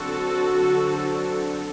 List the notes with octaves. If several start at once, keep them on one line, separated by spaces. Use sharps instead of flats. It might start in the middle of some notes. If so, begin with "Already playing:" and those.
Already playing: D3 F#3 C4 F#4 A4
D3 F#3 C4